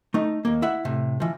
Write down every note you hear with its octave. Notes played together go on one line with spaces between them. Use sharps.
A3 D#4
D#2 A#3
E4 E5 F#5
A2 C3
E3 F3